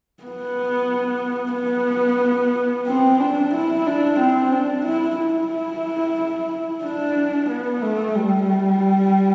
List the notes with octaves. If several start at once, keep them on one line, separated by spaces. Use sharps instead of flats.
B3
B3
C4
D4
E4
D4
C4
D4
E4
E4
D4
B3
A3
G3